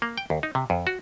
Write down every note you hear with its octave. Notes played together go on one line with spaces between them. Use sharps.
A#3
G5
D#2
D#4
C3
F2
F#4